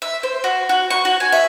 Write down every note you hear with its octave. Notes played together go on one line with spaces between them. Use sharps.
E5
C5
F#4
F#4
C#6
F#4
G#5
E5